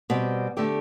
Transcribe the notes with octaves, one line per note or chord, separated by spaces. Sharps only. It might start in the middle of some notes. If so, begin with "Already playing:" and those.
B2 G3 C4
D3 A3 D4 G4